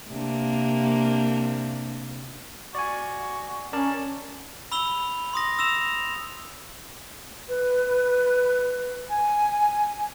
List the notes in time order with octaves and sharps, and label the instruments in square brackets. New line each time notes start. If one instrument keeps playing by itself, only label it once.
[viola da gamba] C3 A#3 D4
[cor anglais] F#4 [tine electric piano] D5 G#5
[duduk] C#4 [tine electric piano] A#4 D5 A5
[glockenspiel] B5 E6 F7 G7
C6 D#6 A#6
E6 A#6 E7 F7
[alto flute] B4
G#5